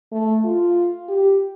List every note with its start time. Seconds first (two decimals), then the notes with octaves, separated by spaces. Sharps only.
0.12 A3
0.44 F4
1.08 G4